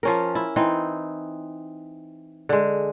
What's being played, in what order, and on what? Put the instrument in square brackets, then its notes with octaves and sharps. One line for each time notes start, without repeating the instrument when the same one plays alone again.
[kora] F3 C#4 A#4
E4
E3 C4 D#4
D3 G#3